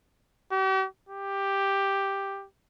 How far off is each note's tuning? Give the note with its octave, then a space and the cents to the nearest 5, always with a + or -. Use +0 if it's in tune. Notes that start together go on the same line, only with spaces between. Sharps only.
G4 -45
G4 +5